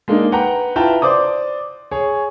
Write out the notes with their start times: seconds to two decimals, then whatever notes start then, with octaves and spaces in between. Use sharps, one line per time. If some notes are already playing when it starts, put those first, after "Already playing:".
0.08 G#3 A#3 D4 D#4
0.32 B4 F#5 G5 A#5
0.76 E4 F4 B4 G5 A5 A#5
1.02 C5 D5 D6 D#6
1.91 G#4 C#5